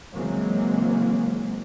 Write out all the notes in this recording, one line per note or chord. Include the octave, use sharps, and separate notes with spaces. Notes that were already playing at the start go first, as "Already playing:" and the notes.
C#3 E3 F#3 G#3 A#3 C4